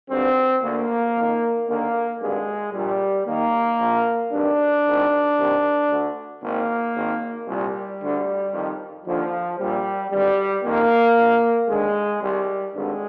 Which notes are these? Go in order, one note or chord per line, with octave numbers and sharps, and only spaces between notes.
G#1 G2 D3 C4
D2 D3 A#3
F2 D#3
D#2 D3 A#3
G#1 G2 D3 G#3
A#1 A#2 G3
D#2 D#3 A#3
A#1 A#2
G#1 G2 D#3 D4
G#1 G#2 D#3
C2 C3 D#3
D2 D3
G#1 G#2 D#3 A#3
G#1 G#2 D#3
C2 A#2 G3
D2 D3
F2 D#3
D#2 D3 F3
A#1 A#2 G3
G#1 G2 D3 G3
F2 D#3 A#3
A#1 A#2
D#2 D3 G#3
C2 C3 D#3 G3
G#1 G2 D3 G#3